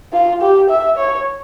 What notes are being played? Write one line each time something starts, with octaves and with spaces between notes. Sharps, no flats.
F4
G4
E5
C#5